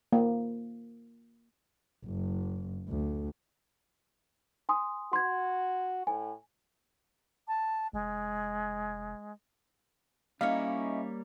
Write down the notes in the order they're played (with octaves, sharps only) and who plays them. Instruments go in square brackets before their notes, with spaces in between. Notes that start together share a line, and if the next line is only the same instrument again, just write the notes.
[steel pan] A#3
[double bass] F#1
D2
[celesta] G#5 C6 D#6
[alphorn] F#4 [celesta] C6 G#6
[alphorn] A2 [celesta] G#5
[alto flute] A5
[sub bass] F1 [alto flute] G#3
[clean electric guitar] G3 A#3 C#5 [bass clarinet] C#4 [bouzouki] D#4 E4 [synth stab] F5